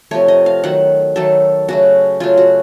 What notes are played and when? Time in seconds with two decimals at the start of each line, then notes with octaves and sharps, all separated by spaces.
0.11 C3 F3 A3 C#5
0.28 D#5
0.46 F5
0.64 D#3 F#3 A3 F#5
1.16 D#3 F#3 A3 A4
1.68 C#3 F#3 A3 F#4
2.20 C#3 F#3 A3 F4
2.37 F#4